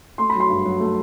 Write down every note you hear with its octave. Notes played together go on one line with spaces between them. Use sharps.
A3 C6
B5
F#3
C6
G2
F#3
A3